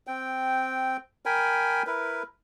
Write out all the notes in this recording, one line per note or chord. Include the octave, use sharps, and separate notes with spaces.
C4 G5
A#4 G5 G#5 B5
E4 A#4 B4